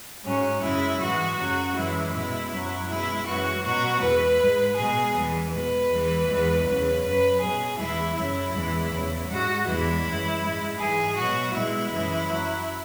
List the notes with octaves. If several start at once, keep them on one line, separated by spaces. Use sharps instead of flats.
G#2 F#3 C#4
F#2 C#3 G#3 E4
G#2 E3 G#3 F#4
F#2 C#3 F#3
F#2 E3 G#3 E4
B2 G#3 E4
F#2 F#3
B2 G#3 E4
F#2 E3 G#3 F#4
B2 F#3 F#4
E2 E3 G#3 B4
G#2 G#3
B2 G#3 G#4
E2 E3 G#3
B2 G#3 B4
E2 E3 G#3
E2 E3 G#3
E2 C#3 F#3
F#2 F#3 B4
B2 F#3 G#4
E2 E3 G#3 E4
F#2 C#3 F#3 E4
E2 E3 G#3
E2 C#3 F#3
G#2 G#3 F#4
E2 E3 G#3 E4
F#2 E3 G#3
G#2 G#3
G#2 E3 G#3 G#4
B2 F#3 F#4
B2 G#3 E4
F#2 E3 G#3
F#2 F#3